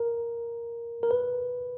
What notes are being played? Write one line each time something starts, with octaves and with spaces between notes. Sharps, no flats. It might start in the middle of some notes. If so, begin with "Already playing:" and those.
Already playing: A#4
A#4
B4